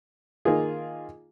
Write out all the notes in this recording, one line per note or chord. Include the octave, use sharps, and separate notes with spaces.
D#3 A#3 F4 G#4